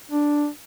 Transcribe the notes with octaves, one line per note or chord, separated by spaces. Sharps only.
D4